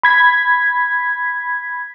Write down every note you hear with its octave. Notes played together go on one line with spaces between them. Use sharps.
B5 G#6 B6